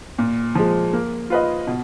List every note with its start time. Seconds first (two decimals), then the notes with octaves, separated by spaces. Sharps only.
0.19 A#2
0.55 F3 G#3
0.93 A#3
1.30 F4 B4 D#5
1.67 B2